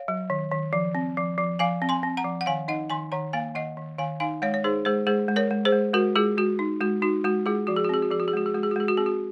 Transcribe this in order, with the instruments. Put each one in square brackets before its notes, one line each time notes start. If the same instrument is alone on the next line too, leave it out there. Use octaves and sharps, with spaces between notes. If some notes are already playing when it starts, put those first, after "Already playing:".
Already playing: [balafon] C#5 F5
F#3
D#3
D#3
F3
C4
F3
F3
F3 F5 G#5
C4
G#5 C6
C4
F#5 A#5
F3
F#5
D#3 F5 G#5
D#4 D#5 F#5
D#3 G#5 C6
D#3 F#5 A#5
A#3 F5 G#5
D#3 D#5 F#5
D#3
D#3 F5 G#5
D#4 F5 G#5
G#3 C#5 F5
C#5
D#4 G#4 C5
G#3 G#4 C5
G#3 G#4 C5
G#3
A#4 C#5
G#3
G#4 C5
G#3
G#3 F#4 A#4
G#3 F4 G#4
G#3 F#4
D#4
G#3 F#4
D#4 F#4
G#3 F#4
G#3 F4 G#4
F3 F#4
G#4
F#4
C4 G#4
F#4
F3 G#4
F#4
G#4
G#3 F#4
G#4
G#3 F#4
G#4
F#4
G#3 G#4
F#4
C4 G#4
F#4